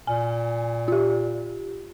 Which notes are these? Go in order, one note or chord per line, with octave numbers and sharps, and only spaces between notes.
A#2 G#5
F4 G4